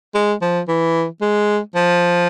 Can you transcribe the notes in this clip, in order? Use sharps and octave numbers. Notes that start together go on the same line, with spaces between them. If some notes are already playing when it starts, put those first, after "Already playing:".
G#3
F3
E3
G#3
F3